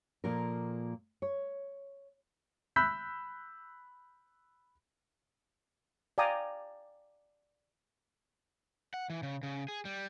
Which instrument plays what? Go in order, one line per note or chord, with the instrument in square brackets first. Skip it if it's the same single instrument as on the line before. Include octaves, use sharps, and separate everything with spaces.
[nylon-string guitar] A#2 F3 A#3 F4 A4 A#4
C#5
[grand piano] B5 E6 F#6 G6 B6
[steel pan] D5 F5 G5 G#5 A#5 D#6
[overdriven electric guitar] F#5
E3
C#3
C#3
G#4
G3